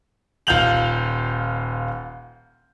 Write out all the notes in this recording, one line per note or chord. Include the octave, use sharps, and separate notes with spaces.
D#1 F4 F5 G6 F7 F#7